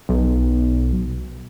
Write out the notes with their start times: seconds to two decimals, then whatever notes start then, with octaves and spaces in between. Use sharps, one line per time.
0.09 B1